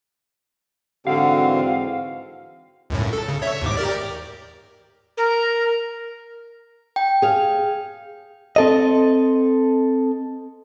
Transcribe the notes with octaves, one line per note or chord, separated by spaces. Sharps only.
G#2 D3 E3 C4 F#4 F5
C#2 F#2 A2
A4
C#3
C#5 E5
D#2 G#2 D6
G4 A#4 D5
A#4
G5
G#4 F5
C4 A4 D#5